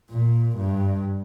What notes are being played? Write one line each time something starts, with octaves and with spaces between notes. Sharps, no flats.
A#2
G2